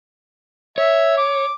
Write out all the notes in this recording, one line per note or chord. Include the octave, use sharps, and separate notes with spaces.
C#5 E5
D6